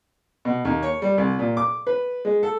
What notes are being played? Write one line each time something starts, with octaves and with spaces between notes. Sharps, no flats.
B2
D#2
C#5
G3
C2
A#2
D6
B4
G#3
A4